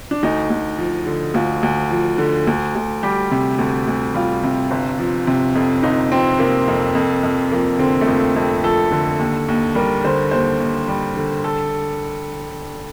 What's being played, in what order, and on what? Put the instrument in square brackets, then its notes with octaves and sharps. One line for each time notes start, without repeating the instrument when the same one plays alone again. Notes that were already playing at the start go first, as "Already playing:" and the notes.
[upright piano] D4
D2 D#4
D2
F3
D3
D2 F4
D2
F3
D3
D2
D2
G3 G4
C3
D2
D2
G3 F4
C3
G1
F3
C3
F2
G1 D#4
F3 C4
C3 A#3
F2
F2
F2
F3 A#3
D3 C4
A3
F2 A#3
F2
F3 A4
D3
D#2
D#2
G3 A#4
D3 C5
D#2 C5
D#2
G3
D3
A4